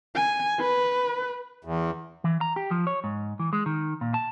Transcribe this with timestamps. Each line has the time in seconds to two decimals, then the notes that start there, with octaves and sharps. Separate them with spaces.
0.16 G#5
0.60 B4
1.65 E2
2.24 E3
2.41 A#5
2.56 G4
2.71 F3
2.87 C#5
3.04 G#2
3.39 E3
3.53 G#3
3.66 D#3
4.01 A#2
4.14 A5